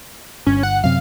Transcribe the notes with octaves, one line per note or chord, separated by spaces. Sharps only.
G1 C#4
F#5
F#2 C3 F5